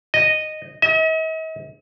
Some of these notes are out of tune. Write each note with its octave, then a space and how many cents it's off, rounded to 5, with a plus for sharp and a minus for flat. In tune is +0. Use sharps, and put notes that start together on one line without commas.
D#5 -10
D#5 +45